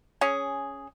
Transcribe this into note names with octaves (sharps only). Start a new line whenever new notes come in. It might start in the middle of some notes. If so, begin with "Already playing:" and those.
C#4 G#4